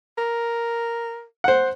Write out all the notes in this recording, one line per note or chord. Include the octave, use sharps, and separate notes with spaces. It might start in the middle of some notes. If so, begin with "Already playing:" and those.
A#4
C5 F#5